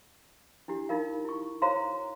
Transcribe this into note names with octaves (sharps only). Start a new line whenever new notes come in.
D4 E4 G4
D#4 F4 A#4 F5
E4 C#6
F#4 C5 C#5 F5 A#5 C6